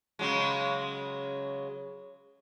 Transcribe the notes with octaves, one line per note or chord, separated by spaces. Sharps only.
C#3 F#3 G#3